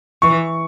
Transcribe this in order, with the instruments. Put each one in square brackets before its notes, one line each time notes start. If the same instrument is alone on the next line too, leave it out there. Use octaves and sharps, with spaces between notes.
[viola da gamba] E3 [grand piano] C#6